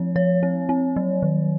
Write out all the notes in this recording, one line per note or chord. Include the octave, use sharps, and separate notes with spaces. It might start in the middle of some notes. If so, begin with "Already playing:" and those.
Already playing: F3 C4 C#5
F3 C#5
C4
C4
F#3
D#3